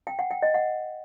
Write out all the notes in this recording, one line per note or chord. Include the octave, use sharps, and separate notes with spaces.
G5
F#5
G5
D#5
F#5